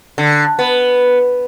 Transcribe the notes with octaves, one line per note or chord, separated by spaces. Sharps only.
D3
B3